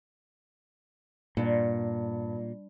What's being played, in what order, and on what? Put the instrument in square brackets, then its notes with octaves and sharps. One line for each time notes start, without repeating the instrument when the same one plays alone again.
[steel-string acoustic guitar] G2 [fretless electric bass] A#2